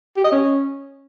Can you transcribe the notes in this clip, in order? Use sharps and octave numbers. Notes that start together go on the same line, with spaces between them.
G4
D#5
C#4